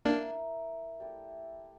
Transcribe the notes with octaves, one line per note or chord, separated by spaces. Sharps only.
A#3 D4 E4 A#4 E5
A3 E4 G4 D5